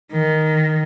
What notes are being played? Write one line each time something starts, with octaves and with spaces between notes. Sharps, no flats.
D#3